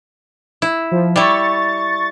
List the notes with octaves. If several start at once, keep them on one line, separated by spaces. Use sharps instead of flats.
E4
F3
G3 E4 C#6 A6